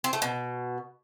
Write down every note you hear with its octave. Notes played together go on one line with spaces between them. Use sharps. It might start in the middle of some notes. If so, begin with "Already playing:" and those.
C4
A3
B2